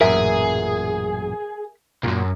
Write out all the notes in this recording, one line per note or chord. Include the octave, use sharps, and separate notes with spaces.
A1 F#2 A#2 G#4 A#4 E5
C2 F#2 A#2